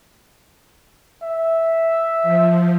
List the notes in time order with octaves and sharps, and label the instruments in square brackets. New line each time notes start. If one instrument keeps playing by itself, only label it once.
[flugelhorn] E5
[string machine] F3